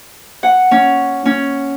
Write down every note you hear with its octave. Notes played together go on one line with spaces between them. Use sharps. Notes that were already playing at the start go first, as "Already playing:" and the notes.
F#5
C#4
C#4